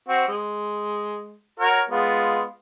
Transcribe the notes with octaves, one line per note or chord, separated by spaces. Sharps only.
C4 F#4
G#3
F#4 A#4 C#5
G#3 B3 F4